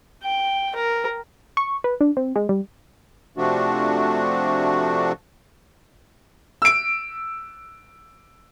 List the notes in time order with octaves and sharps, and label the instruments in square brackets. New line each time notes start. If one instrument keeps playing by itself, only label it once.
[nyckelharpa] G5
A#4
[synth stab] C#6
B4
D4
C4
G#3
G3
[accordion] C3 F3 A3 D4 F#4
[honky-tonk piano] E6 D7